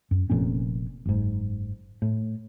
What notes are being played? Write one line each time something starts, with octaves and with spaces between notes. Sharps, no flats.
F#2
F1 F2 A#2 C#4
F#1 G#2
A2